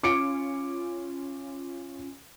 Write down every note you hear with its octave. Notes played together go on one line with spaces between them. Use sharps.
C#4 F4 D6 C#7 D7